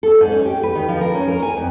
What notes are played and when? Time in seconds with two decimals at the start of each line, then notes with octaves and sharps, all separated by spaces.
0.03 A4
0.20 G#2
0.32 C#4
0.46 G4
0.63 B4
0.75 D#3
0.89 F3
1.01 A#4
1.15 C#4
1.28 A#4
1.43 G#5
1.57 F2